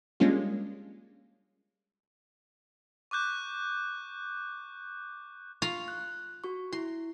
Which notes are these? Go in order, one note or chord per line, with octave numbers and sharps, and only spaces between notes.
G3 G#3 A#3 C#4 D4 F4
C#6 D6 F#6 G6
F4 F5 A#5 C#6
F#6
F#4 C#6
E4 C6